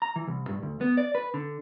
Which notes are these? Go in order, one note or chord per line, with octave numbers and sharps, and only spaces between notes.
A#5
E3
C2
G2
D2
B3
D5
B4
D3